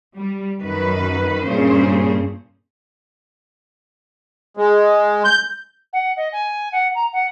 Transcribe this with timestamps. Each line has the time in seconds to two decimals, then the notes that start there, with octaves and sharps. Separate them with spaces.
0.15 G3
0.62 F#2 D#3 B4
1.47 G2 A#2 C#3 C#4 G#4 C5
4.57 G#3
5.25 G6
5.93 F#5
6.17 D#5
6.33 G#5
6.72 F#5
6.95 A#5
7.13 F#5